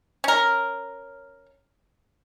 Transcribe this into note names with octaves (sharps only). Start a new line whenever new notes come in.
C#4 A#4